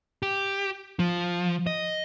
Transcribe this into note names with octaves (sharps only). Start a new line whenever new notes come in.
G4
F3
D#5